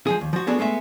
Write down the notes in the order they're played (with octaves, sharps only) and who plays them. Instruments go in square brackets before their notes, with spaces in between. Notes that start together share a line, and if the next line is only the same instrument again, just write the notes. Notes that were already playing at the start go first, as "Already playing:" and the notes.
[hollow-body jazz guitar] F3 G#3 G#4
D#2
F3 F#4
B3 D4 F#4 G#4 A4 B4
G#3 A3 B3 E5